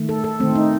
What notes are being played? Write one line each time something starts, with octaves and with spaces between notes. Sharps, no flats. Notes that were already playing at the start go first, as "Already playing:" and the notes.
Already playing: D#3 A3
A4
A4
D#3 A3 C4
D#4